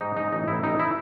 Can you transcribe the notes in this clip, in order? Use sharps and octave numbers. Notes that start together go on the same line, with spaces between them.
G#2 D#4
G#2 D#4
A1 D#4
A1 E4
A1 D#4
E4